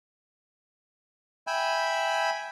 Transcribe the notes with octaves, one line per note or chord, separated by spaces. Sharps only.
E5 G5 G#5 B5